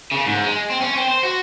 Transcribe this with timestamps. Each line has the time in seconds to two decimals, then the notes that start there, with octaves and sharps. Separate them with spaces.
0.12 C#3
0.26 G#2
0.44 G#3
0.70 C4
0.81 C#4
0.96 C4
1.08 C5
1.23 F#4